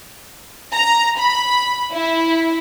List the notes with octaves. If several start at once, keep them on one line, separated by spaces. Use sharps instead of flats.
A#5
B5
E4